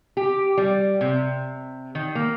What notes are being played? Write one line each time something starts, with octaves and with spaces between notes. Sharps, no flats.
G4
G3
C3
D#3
A#3